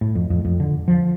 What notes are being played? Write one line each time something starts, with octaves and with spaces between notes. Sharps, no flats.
A2
F2
F2
F2
D3
F3